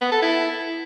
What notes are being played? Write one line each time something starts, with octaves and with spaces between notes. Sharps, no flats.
B3
A4
E4